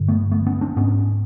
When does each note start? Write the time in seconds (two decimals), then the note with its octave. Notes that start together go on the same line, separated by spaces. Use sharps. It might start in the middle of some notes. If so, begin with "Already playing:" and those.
Already playing: G2 D3
0.08 A3 B3
0.31 A3 B3
0.47 B3 C#4
0.61 C4 D4
0.76 G#2 B3 C#4